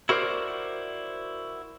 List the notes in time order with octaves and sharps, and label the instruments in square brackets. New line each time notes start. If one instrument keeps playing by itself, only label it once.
[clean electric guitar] E4 F#4 A#4 C5 D5